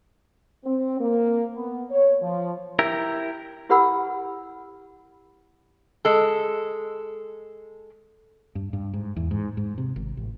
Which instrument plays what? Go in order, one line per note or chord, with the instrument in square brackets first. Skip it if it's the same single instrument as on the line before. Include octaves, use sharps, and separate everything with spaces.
[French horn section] C4
A#3
B3
C#5
F3
[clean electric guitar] E4 G4 A#4
[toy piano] E4 G4 B4 F#5 B5 E6
[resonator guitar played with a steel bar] G#3 A4
[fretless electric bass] G2
G2
G#2
E2
G#2
G#2
C3
G#1
A1